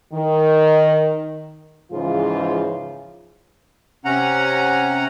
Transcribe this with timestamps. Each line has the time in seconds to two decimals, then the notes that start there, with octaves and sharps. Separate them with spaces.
0.13 D#3
1.92 G#2 C#3 E3 F3 F4 G#4
4.05 C3 C#4 F#5 A#5